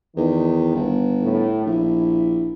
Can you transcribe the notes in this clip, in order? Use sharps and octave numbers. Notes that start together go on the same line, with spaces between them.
E2 D#3
G1
A2
A#1 E4